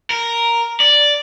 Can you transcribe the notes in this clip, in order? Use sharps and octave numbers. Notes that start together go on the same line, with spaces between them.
A#4
D5